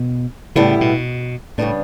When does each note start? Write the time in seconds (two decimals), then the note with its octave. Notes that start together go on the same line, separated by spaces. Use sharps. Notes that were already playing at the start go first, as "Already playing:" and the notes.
Already playing: B2
0.56 A2 C#3 G3 B3 E4
0.81 B2
1.58 A2 C#3 G3 B3 D4